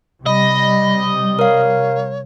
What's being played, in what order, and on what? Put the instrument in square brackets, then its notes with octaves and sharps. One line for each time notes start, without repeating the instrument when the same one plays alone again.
[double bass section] C3 G3 [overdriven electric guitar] D#5 [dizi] B5
[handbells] A#4 F5 [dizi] C#5